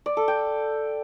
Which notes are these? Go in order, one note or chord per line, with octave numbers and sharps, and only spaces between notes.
D5
A4
G5